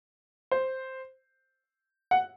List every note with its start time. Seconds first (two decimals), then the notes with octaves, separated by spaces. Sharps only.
0.51 C5
2.11 F#5